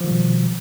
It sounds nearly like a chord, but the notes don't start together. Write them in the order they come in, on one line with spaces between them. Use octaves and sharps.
F3 D#3 G3 B2